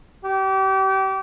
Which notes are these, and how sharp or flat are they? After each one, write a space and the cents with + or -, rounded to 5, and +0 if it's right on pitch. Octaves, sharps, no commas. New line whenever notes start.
G4 -30